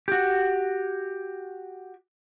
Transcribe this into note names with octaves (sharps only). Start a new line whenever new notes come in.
F#4 G4